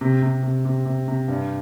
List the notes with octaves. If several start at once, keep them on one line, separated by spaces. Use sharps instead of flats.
C3
C3
C3
C3
C3
C3
G2